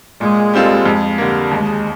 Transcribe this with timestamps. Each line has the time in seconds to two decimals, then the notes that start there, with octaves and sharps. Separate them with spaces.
0.21 A#2 G#3
0.54 G3 C4 F4 A4
0.86 F2
1.18 D3 G3 A#3
1.51 D#2 G#3